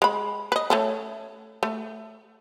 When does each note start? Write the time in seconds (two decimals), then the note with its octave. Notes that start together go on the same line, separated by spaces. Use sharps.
0.02 G#3 B5
0.52 B4 D#5
0.70 A3 C#4 A4
1.63 A3